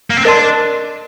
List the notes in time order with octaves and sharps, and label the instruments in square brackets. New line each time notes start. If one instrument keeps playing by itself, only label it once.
[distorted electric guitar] A#3
C4
[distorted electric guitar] D4 [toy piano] A#4 D#5 A5 C6